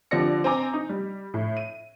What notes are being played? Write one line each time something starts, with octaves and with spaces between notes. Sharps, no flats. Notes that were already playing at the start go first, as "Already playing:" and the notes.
D3 F3 G4 D5 A#6 C#7
C4 G#5 A#5 D6
D#4
G3
A2
D#7